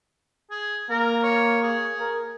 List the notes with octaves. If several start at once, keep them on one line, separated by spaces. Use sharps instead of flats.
G#4
A#3 A#4
C#5
G#4
A#4